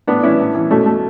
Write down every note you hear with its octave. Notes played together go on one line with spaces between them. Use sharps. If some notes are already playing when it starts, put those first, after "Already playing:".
A2 B3 D4
E3 C#4 E4
A2
E3
B2 A3 C#4
A3